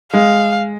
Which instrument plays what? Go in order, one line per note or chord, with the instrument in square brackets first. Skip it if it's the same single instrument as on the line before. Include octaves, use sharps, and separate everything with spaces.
[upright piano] G#3 [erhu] F5